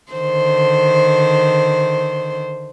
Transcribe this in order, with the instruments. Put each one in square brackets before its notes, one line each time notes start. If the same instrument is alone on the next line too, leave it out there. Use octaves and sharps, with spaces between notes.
[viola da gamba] D3 D#3 C5